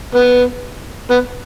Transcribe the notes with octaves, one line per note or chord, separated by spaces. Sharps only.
B3
B3